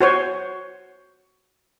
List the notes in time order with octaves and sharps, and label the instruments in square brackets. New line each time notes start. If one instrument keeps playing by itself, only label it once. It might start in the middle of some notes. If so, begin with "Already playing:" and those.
[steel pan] F#4 C5 C#5